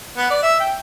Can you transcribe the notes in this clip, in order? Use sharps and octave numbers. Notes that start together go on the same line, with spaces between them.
B3
D5
E5
G5